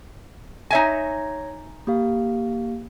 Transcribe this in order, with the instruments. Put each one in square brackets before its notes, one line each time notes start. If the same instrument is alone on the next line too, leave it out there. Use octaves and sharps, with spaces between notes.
[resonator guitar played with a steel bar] D#4 E5 G#5 [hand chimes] C#5 G#6 A#6
[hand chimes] A#3 G4 F5